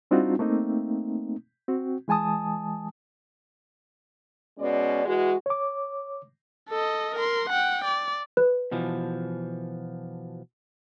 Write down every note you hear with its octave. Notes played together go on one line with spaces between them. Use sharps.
G3 C4 D4 D#4 F4 F#4
A3 A#3 C4 D#4
C4 F#4
E3 G#3 G#5 A5 D#6
B2 G#3 C#4 D5
E3 G#3 F#4
C#5 D6
A4 D#5
A#4 C6
F#5 G5
D5
B4
B2 E3 F3